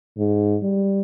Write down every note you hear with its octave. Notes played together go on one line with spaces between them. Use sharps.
G#2
G3